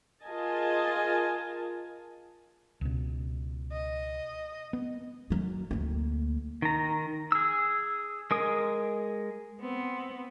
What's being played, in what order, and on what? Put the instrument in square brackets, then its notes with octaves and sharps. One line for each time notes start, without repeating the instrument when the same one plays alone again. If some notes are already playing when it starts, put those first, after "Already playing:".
[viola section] F4 G#4 A#4 D#5 G#5 A5
[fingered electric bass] C#2 B2
[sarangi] D#5
[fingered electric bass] B3
[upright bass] F#2 F#3
D2 A#3
[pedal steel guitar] D#3 A#5
G#4 E6
G#3 A#4 D#6
[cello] B3 C4